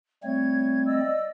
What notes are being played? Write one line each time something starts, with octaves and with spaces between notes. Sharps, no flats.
G3 A3 C4 C#5 G#6
D5 D#5 E6